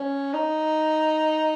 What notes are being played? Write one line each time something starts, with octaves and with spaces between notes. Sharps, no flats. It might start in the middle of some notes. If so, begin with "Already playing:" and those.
Already playing: C#4
D#4